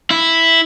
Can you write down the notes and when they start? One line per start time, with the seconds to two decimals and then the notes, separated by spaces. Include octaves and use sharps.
0.11 E4